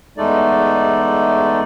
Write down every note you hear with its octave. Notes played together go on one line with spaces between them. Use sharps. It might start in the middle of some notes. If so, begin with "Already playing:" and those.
E2 G#3 A3 D#4 A4 D5